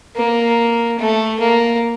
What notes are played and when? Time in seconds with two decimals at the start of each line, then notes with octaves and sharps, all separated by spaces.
0.16 A#3
0.99 A3
1.40 A#3